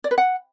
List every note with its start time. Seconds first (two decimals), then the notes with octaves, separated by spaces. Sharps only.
0.04 D5
0.11 B4
0.18 F#5